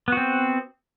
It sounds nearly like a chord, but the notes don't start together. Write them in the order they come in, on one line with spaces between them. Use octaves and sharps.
B3 F#4 C4